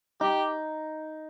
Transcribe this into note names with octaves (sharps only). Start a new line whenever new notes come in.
D#4 G4